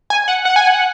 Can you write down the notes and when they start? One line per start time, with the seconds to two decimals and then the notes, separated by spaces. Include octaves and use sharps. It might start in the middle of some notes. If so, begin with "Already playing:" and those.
0.10 G#5
0.28 F#5
0.45 F#5
0.56 G#5
0.67 F#5